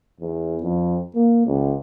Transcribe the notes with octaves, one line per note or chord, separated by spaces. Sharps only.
E2
F2
A#3
C#2